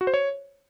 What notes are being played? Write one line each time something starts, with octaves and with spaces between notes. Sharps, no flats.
F#4
C5
C#5